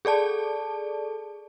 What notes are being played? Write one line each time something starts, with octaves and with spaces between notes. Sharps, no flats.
G#4 A4 D5 A5